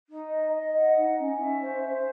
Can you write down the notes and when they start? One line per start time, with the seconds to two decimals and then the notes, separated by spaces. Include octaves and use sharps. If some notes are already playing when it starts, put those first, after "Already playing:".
0.08 D#4
0.30 D#5
0.51 D#5
0.74 F#5
0.96 D#4
1.17 C#4
1.40 E5
1.61 C5
1.83 C5